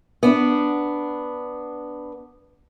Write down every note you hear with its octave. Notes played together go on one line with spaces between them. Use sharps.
B3 D4